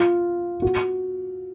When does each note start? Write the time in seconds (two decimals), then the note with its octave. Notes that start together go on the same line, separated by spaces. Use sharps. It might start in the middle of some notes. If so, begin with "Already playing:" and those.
Already playing: F4
0.62 F#4